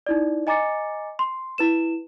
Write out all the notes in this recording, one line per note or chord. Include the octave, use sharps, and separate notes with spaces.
D#4 E4 D5
D#5 G#5 A#5 D6 A6 C#7
C6
E4 B4 E7